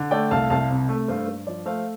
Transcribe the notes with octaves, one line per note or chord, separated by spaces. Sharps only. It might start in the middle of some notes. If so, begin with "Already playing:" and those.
Already playing: D3
A3 D5 G5
C2 F5 A5
C2 F5 A5
C3
A3
G2 C5 F5
G2
F3 D5
A3 C5 F5